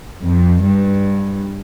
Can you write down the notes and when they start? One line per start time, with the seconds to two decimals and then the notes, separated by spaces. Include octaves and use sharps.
0.23 F2
0.63 G2